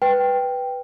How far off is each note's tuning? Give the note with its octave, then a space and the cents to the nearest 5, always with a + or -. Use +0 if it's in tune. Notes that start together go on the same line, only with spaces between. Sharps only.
B4 +0 G5 +0